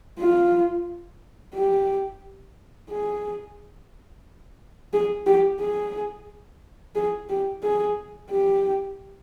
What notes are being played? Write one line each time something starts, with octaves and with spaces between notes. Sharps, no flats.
F4
G4
G#4
G#4
G4
G#4
G#4
G4
G#4
G4